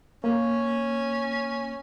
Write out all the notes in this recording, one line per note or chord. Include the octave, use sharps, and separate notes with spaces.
A#3 C#4